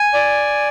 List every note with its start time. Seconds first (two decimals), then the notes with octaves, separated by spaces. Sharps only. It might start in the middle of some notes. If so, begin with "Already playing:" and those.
Already playing: G#5
0.14 D5